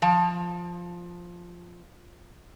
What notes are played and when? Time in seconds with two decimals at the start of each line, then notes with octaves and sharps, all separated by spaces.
0.02 F3 A5